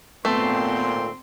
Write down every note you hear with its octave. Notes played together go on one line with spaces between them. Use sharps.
G#1 A#2 A3 B3 C4 C6